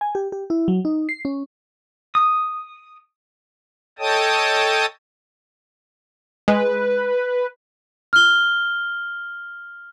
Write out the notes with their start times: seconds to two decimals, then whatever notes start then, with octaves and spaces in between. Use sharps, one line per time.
0.01 G#5
0.15 G4
0.32 G4
0.50 E4
0.68 F#3
0.85 D#4
1.09 C7
1.25 C#4
2.15 D#6
3.99 A4 C#5 D#5 G5 A5 D#6
6.48 G#3 B4
8.13 F6 G7